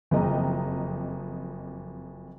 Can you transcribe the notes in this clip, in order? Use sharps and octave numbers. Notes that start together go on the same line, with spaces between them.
F#1 F2 D#5 A#5